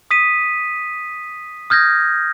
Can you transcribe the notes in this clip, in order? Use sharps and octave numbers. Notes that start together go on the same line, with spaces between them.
D#6 B6 D#7
D#6 F6 G6 G#6 A#6